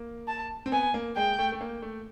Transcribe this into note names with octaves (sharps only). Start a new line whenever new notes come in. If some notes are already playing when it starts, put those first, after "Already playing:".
Already playing: A#3
A5
C4
B3 G#5
A#3
G#3 G5
A3
A3
A#3
A3